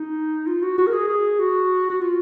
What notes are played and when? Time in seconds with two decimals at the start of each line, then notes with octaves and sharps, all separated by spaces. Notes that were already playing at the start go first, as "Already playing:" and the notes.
Already playing: D#4
0.47 F4
0.62 F#4
0.78 F#4
0.87 A#4
0.93 G#4
1.08 G#4
1.39 F#4
1.90 F#4
2.01 F4